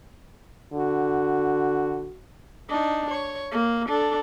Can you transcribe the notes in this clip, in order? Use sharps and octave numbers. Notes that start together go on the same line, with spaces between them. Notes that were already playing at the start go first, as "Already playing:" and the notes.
D3 F#4
D4 D#4
C#5
A#3
D4 A4